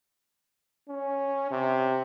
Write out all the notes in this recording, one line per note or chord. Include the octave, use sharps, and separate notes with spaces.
C#4
C3